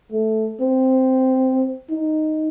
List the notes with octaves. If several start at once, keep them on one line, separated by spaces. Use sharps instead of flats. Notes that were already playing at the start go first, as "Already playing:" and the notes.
A3
C4
D#4